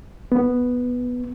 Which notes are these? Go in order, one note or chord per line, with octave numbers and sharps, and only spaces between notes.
B3